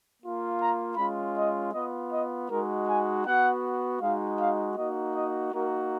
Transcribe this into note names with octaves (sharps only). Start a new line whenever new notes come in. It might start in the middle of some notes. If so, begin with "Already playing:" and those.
A#3 F4
A#5
G#3 C#4 F4 B5
D#5
B3 F4 D#5
D#5
G#3 D#4 F#4 A#4
G#5
B3 F#4 F#5
G#3 D#4 F#4 F5
F5
A#3 D#4 F#4 D#5
D#5
A#3 D#4 F#4 A#4